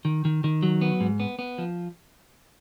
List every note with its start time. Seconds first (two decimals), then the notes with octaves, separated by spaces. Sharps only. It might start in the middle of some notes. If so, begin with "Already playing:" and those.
0.05 D#3
0.25 D#3
0.44 D#3
0.63 F#3
0.81 B3
1.00 G#2
1.20 B3
1.39 B3
1.58 F3